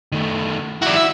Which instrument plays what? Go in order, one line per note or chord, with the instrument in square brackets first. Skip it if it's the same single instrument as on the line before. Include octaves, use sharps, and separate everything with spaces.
[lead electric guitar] D#3 A3
[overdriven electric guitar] G3 F#4 [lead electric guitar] E4
[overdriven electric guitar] E5